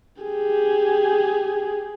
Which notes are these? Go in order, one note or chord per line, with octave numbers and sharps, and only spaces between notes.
G4 G#4